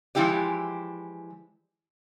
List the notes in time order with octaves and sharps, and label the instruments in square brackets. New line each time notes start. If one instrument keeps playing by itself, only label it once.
[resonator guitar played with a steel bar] E3 F3 G#3 E4 G4 D5